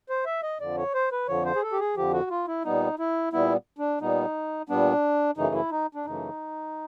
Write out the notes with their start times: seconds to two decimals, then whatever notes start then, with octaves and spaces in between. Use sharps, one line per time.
0.09 C5
0.25 E5
0.43 D#5
0.60 F2 D3 F3 D5
0.77 C#5
0.94 C5
1.12 B4
1.28 F2 D3 F3 C#5
1.45 C5
1.55 G#4
1.62 A4
1.72 G4
1.80 G#4
1.96 F2 D3 F3 G4
2.13 F#4
2.31 F4
2.48 E4
2.65 A#2 G3 B3 D#4
2.99 E4
3.33 A#2 G3 B3 E4
3.78 D4
4.01 A#2 G3 B3 D#4
4.69 A#2 G3 B3 D4
5.37 F#2 C#3 E3 A3 D#4
5.55 E4
5.71 D#4
5.95 D4
6.05 F#2 C#3 E3 A3 D#4